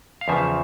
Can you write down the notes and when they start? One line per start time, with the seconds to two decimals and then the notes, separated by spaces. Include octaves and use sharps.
0.21 F5
0.28 E2 C#3 F3 E5